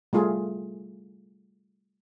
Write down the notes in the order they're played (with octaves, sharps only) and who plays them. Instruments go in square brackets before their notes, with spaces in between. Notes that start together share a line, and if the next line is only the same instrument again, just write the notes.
[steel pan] G3 A3 F4 G#4